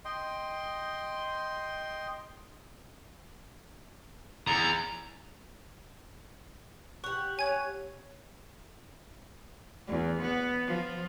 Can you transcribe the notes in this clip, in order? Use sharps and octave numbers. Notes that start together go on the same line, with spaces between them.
D#5 G5 C6
E2 A#5
G4 F#5 C#6
C#5 G#5 G#6
E2
B3
F3